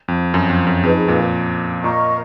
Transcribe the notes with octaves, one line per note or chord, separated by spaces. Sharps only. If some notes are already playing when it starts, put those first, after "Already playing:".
F2
F#2
F2
F#2
F2 D#4 G#4 B4
A#2
A#2 A#4 D#5 A#5 C#6